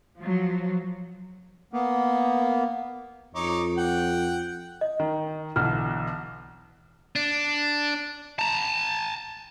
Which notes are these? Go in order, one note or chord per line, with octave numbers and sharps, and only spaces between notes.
F3 F#3
A#3 B3
F2 D#4 C#5 D6
F#5 G5
D#5
D#3
B1 D3 E3 F6
D4
A5 A#5